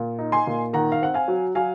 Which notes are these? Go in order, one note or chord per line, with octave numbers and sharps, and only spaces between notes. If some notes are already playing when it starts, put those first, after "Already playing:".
Already playing: A#2
D#4
G#5 C6
A#2
D#3 F#5 A#5
F5
C4 F#5
F5 G#5
F#3
F#3 F5 G#5